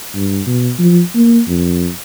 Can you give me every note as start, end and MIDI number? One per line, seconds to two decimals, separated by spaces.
0.14 0.41 43
0.46 0.71 47
0.79 1.01 53
1.15 1.41 58
1.48 1.89 41